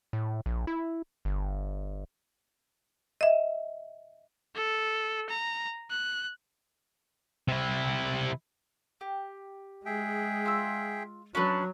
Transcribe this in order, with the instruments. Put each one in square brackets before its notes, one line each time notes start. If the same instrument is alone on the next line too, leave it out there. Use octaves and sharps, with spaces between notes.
[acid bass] A2
A#1
E4
G1
[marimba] D#5 E5
[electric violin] A4
A#5
F#6
[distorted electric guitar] C3 E4
[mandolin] G4
[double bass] G#3 [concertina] G#4 E5 G5
[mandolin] F4 E6
[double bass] F#3 [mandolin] C#4 D4 B4